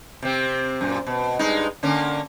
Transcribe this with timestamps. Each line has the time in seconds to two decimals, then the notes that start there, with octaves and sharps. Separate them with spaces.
0.22 C3 C4
0.81 F#2 A#2
1.07 B2
1.39 G2 G#3 D#4
1.83 D3 A#3 C#4